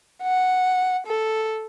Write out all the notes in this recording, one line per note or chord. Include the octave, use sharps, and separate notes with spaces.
F#5
A4